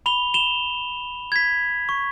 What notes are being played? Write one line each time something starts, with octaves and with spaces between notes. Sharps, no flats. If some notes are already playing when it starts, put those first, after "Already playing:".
B5 F7 G7
E7 F7 G7
G#6 B6
C#6